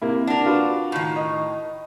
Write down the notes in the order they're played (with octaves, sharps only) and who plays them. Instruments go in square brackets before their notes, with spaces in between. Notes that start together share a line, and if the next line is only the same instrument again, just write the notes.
[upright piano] C3 A#3 E4
[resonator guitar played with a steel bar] D4 A#4 [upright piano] F#5
[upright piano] F4 F#4 B4
[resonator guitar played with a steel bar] A2 D#3
[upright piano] D#5